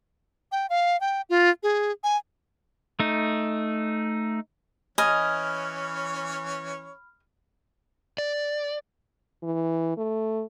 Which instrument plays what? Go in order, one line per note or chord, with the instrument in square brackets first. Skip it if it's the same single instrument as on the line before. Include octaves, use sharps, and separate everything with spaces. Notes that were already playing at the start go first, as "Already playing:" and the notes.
[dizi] G5
F5
G5
F4
G#4
G#5
[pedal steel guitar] A3 D#4
[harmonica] E3 C#4 C#5 [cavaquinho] D#5 G#5 [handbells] B5 F6
[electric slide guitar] D5
[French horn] E3
A3